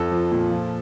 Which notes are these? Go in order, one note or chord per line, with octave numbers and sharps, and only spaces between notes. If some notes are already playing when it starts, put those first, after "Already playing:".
Already playing: F2 A4
F3
A#2
F3